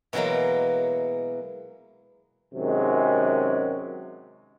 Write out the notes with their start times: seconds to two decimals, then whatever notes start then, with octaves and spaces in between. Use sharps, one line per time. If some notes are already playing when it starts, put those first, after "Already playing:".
0.13 B2 E3 F#3 G#3 A#3
2.54 F#2 C3 D#3 G#3